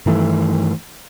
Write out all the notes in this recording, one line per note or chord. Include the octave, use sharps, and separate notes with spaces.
G2 D#3 E3 A3